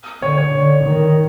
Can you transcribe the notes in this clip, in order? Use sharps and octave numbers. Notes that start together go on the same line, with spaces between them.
D3 C#5
C#5
D3
D#3